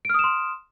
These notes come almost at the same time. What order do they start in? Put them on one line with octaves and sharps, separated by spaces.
D7 F6 D#6 E7 C6